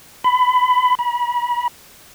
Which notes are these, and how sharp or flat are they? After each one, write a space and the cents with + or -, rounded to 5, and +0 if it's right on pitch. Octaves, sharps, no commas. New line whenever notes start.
B5 +25
B5 -35